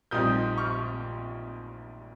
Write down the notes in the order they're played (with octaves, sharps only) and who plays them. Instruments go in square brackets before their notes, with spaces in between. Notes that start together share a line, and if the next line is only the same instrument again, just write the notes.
[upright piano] A#1 A#2 G3 C4 D#4 D#6 G6
C#6 F6